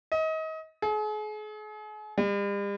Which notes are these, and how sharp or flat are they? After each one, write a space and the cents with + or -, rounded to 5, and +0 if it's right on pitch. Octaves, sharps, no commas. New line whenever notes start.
D#5 +30
G#4 +40
G3 +45